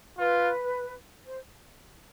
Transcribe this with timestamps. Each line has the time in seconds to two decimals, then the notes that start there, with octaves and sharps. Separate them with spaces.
0.18 F4 B4
1.23 C5